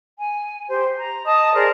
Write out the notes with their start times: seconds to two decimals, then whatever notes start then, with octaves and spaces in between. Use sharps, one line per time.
0.19 G#5
0.69 G4 C5
0.97 A#5
1.26 D#5 A5 D#6
1.54 G#4 A#4 C5 D5